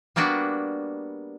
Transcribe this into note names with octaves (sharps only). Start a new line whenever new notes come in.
G3 A#3 B3 D4 F#4